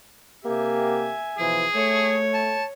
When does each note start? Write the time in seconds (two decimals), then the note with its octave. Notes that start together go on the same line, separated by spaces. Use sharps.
0.45 C3 A#3 G4 E5 G#5
1.38 B2 E3 F3 G#4
1.74 A3 C#5
2.33 A5